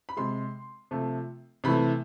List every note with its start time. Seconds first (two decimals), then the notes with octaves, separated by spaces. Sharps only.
0.09 B5
0.17 C3 G#3 C6
0.91 C3 F3 A3
1.64 C3 E3 A3 B5